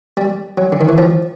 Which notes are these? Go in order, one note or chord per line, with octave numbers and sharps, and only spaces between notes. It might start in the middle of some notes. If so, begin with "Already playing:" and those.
G3
F#3
D3
D#3
E3
F3